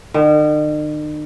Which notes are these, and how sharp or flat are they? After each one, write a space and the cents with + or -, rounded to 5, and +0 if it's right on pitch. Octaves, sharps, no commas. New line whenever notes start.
D#3 -45